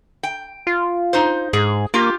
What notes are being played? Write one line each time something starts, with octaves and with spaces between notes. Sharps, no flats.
G5
F4
D#4 C5
G#2 G#4
A#3 F4 G4